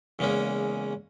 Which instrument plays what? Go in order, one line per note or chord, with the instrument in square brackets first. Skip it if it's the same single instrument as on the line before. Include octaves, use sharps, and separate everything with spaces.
[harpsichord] E2 C#3 G#3 A#3 C#4